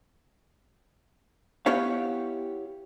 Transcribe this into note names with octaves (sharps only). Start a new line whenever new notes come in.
B3 E4 G4 C#5 F5